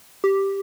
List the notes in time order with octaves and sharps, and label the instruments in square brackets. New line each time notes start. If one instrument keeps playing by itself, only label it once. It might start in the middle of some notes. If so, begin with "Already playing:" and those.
[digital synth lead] G4